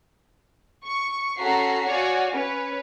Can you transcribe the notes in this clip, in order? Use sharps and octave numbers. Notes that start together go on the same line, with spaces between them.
C#6
C#4 F#4 A4 A#5 B6 C7
F#4 C#5 D5 F5 G#5
C#4 B4 C#5